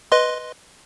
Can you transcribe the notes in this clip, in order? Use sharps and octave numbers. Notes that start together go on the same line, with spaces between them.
B4 D#5 C6